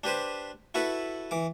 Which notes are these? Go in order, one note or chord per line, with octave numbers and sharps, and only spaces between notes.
D4 G4 B4 C5
E4 F#4 A4 B4
E3 D6